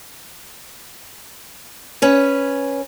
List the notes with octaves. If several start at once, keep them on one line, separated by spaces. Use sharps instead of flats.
C#4 B4